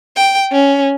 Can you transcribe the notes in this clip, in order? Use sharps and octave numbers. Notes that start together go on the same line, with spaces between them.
G5
C#4